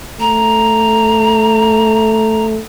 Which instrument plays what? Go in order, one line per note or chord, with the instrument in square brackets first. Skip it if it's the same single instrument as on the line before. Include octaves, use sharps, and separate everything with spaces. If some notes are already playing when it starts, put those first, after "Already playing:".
[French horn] A3 [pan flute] A#5